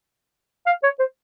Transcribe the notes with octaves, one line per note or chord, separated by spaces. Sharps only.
F5
C#5
C5